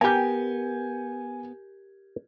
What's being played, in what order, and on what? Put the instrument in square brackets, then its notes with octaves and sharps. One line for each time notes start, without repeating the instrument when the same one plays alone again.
[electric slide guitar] B3 [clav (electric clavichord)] G4 A#4 [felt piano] G#5 G6